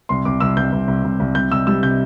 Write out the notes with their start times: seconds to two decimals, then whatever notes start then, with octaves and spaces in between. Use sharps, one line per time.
0.09 C2 C6
0.25 C2 D6
0.40 C2 E6
0.57 C2 G6
0.73 C2
0.88 C2
1.04 C2
1.20 C2
1.35 C2 G6
1.51 C2 E6
1.67 G3 E6
1.83 C3 G6